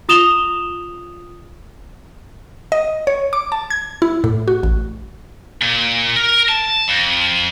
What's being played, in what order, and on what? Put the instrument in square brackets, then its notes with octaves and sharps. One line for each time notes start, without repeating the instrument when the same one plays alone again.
[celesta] F4 D#6 E7 F7 G7
[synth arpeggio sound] D#5
C#5
D6
A5
G#6
E4
A2
F#4
A1
[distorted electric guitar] A#2
A#4
A5
F2